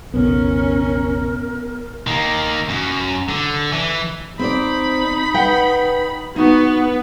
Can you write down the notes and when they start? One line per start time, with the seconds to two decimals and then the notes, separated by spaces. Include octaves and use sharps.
0.14 B1 F2 C#3 B3 C#4 A#4
2.07 D#3 A#3
2.69 F#2
3.29 D3
3.72 E3
4.39 C4 D#4 C5 D5 B5
5.34 B4 F#5 G5
6.36 B3 D#4 F#4 B4